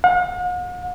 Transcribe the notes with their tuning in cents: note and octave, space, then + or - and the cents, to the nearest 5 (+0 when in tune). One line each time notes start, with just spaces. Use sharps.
F#5 -45